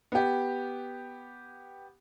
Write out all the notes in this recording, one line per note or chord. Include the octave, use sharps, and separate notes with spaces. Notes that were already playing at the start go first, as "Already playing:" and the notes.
B3 G4